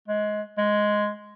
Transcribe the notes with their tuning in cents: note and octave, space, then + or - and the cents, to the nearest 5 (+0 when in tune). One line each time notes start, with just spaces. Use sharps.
G#3 +20
G#3 +5